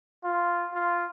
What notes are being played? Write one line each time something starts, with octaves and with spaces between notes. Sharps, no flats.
F4
F4